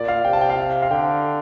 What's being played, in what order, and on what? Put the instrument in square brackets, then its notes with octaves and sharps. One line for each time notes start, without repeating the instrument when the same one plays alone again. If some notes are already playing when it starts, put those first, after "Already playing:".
Already playing: [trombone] A#2 [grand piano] D5
[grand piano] F5
[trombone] C3 [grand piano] G5
[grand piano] A5
G5
F5
F5
[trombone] D3 [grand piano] G5